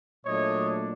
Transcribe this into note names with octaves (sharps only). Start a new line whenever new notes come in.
A#2 F#3 A3 D4 C#5 D#5